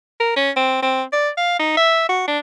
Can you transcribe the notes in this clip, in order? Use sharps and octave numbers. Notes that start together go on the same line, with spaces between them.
A#4
C#4
C4
C4
D5
F5
D#4
E5
F#4
D4